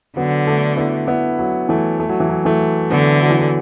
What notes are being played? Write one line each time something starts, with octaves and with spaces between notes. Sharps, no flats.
D3 F#3 B3
A3 D4
B3 E4
B3 E4
F#3
E3 A3
A3
F#3
E3
F#3
E3 A3
D3 F#3 B3
F#3
E3
F#3